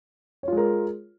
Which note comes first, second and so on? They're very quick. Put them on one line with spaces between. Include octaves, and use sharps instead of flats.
C#5 F4 G#3 A#4